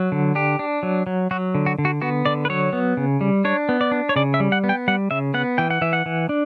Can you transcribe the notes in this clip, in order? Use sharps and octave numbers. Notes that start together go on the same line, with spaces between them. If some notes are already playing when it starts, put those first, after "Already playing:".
Already playing: F#3
D3
D4 G4
D4
F#3
F#3
F#3 F#4
D3
F#4
D3
F#4
B3 F#4
D3 D5
B4
F#3 C#5
B3
C#3
G3
D4 C#5
B3
D5
D4
C#5
C#3 D5
E5
G3
F#5
B3
G5
G3 F#5
C#3 E5
B3 F#5
E3 G5
F#5
E3 E5
F#5
E3
D4